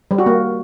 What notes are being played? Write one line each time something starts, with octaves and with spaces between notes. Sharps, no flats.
G3
F#4
A#3